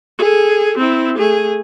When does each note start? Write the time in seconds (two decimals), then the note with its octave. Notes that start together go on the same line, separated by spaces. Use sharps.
0.19 G#4 A4
0.78 C4 E4
1.17 A3 G#4